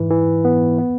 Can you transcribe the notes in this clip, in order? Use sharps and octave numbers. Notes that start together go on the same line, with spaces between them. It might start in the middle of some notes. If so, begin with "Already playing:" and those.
Already playing: G#2 E3
E3
B3
B3